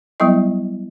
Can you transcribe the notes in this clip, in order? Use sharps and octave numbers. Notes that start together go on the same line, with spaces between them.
F#3 G3 B3 E4 D#5